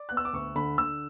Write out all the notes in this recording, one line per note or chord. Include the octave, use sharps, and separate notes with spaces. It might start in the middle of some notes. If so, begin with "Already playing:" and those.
Already playing: D5
B3 F#6
E6
D6
D2 C#6
D3 B5
D3 E6